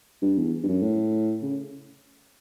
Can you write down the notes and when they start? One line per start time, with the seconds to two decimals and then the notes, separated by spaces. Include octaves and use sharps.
0.22 G2
0.38 E2
0.63 G2
0.68 F#2
0.82 A2
1.42 C#3